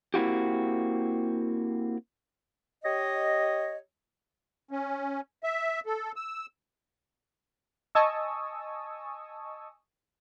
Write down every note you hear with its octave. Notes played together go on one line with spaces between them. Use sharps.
A#3 C4 E4 F#4 G4
G4 C#5 D#5
C#4
E5
A4
E6
D#5 G#5 A5 C#6 D#6 E6